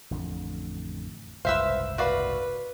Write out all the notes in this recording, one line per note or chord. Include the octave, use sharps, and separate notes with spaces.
A1 F2 D3
F#1 C2 G#2 B4 C5 E5 F5 E6
F#4 B4 D5 F5